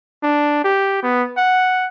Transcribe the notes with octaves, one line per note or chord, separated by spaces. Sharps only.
D4
G4
B3
F#5